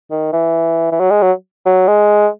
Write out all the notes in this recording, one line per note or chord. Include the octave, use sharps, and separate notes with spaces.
D#3
E3
E3
F#3
G#3
F#3
F#3
G#3